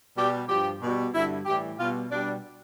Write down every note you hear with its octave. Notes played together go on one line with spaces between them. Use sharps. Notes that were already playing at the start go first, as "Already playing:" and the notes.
B2 G3 G4
G2 F3 G4
B2 G3
G2 D3 G3 E4
A2 E3 G3 G4
B2 G3 F4
B2 G3 D4